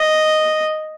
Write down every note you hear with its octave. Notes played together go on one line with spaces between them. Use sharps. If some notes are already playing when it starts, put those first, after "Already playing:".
Already playing: D#5